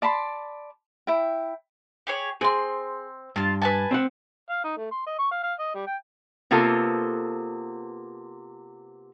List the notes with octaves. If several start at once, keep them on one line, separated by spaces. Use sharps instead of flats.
D5 A5 B5 C6
E4 G5
G4 G#4 C#5
C4 G#4 C6
G2 F4 A5
B4 G#5 A5
C4 C5 F#5
F5
D#4
A3
C6
D#5
C#6
F5
F5
D#5
G3
G5
C3 A#3 B3 F4 A4 C5